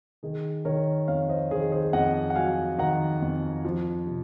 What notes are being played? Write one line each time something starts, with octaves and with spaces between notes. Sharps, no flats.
D#3 G#4
D#3 A#4 C#5
F2 C#5 F5
C5 D#5
D#3 G#4 C5
G#4 C5
F2 D#5 F#5
F#5
F#3 F5 G#5
D#3 F#5 A#5
F2
F3
C3